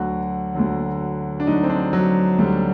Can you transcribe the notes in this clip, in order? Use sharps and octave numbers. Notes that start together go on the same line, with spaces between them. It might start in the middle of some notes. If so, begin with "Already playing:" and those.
Already playing: D2 D3 F#3 F#4
D2 D3 F#3
D4
D2 D3 F#3 D#4
C4
D4
F#3
D2 D3 F#3 G3